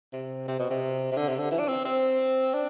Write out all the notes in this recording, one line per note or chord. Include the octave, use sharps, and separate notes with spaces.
C3
C3
B2
C3
C3
D3
C3
D3
E3
D4
C4
C4
D4